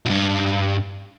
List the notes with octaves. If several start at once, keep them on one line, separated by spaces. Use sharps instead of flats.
B1 G2